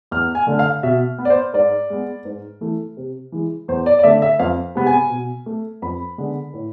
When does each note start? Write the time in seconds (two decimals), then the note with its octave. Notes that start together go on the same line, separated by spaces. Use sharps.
0.11 E2 F6
0.35 G#5
0.47 D3 A3
0.59 F5
0.83 B2 E5
1.18 B3
1.25 D5
1.30 C5
1.54 G#2 D5
1.90 G#3 B3
2.25 G#2
2.61 E3 A3
2.97 C3
3.32 E3 G#3
3.68 E2 C5
3.86 D5
3.99 D5
4.03 D3 A3 E5
4.22 E5
4.39 F2 F5
4.75 C3 G#3 B3
4.87 G#5
5.10 B2
5.46 A3
5.82 F2 B5
6.18 D3 G#3 B3
6.54 A2